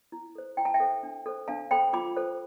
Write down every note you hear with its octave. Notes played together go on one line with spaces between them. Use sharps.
E4
A4 C5
E4 G5
A5
E5 G5
A4 C5
D4
A4 C5
D4 F5 A5
A4 C5 G5 B5
F4 B5 D6
A4 C5